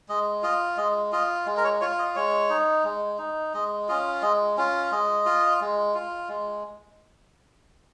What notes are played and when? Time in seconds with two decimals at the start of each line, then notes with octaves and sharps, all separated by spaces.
0.09 G#3 D#5
0.43 F4 D#5
0.77 G#3 D#5
1.12 F4 D#5
1.46 G#3
1.57 A#4
1.64 C#5
1.81 F4 C#5
1.99 D#5
2.16 G#3 C#5
2.50 D#4
2.84 G#3
3.18 D#4
3.54 G#3 D#5
3.88 C#4 F4 D#5
4.22 G#3 D#5
4.57 C#4 F4
4.91 G#3 D#5
5.26 F4
5.61 G#3
5.94 F4
6.29 G#3